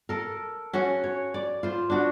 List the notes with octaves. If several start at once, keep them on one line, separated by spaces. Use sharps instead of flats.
A4 A#4
C#4 F#4 F#5
C#5
D5
F4 C5
D4 F#4